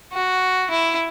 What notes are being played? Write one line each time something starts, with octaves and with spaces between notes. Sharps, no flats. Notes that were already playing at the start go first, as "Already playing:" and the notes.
F#4
E4